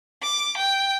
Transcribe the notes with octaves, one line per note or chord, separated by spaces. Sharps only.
D6
G5